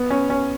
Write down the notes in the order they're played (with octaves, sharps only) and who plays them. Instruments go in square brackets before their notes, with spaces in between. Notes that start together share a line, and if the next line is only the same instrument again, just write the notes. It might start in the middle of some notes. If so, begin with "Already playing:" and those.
Already playing: [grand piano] B3
C#4
C#4